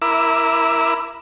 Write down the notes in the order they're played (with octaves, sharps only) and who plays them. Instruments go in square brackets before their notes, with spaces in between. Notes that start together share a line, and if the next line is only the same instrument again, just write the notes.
[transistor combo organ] E4 A#4 B5 D6 E6